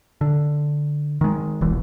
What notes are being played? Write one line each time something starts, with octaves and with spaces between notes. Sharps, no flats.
D3
D#3 G#3
D#1 B1 E3